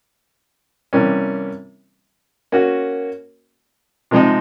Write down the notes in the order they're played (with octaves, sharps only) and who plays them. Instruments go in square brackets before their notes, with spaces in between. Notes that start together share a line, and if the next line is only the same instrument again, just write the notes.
[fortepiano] C3 E3 G3 A#3 C#4
A#3 C#4 F#4
C3 F3 G#3 C4 D#4